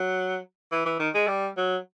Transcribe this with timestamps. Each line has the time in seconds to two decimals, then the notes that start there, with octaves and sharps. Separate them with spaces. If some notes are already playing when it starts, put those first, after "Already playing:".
Already playing: F#3
0.72 E3
0.85 E3
0.99 D#3
1.14 G#3
1.28 G3
1.57 F#3